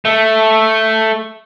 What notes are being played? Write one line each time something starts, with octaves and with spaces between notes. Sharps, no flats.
A3